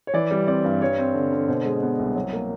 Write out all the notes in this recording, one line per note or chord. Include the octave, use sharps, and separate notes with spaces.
C#5
E3 D5
G3
C4 D5
G2
G3 C#5
C4
D3
D3
B2 C5
G#3
B3
C2
F#3
A#3